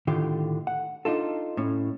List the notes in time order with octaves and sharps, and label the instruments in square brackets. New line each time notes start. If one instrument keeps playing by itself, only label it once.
[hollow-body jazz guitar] A2 D3 D#3 F4 G4
F#5
D4 D#4 F4 A4
A2 C#4